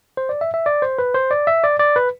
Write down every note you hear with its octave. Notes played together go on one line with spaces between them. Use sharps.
C5
D5
E5
E5
D5
C5
B4
C5
D5
E5
D5
D5
B4